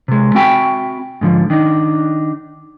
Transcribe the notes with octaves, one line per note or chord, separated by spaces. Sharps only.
C3 G#3
C4 F#4 E5 G5 G#5 B5
G#2 D3 F3
D#3 D4 D#4